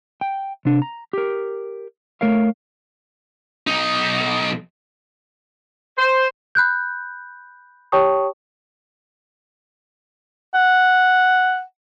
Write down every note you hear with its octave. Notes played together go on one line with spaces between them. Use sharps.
G5
C3 D4
A#5
G4 A#4
A3 A#4 C#5 F5
B1 D#4
C5
B5 F#6 G6
G4 C#5 G5 A5 C#6 D#6
F#5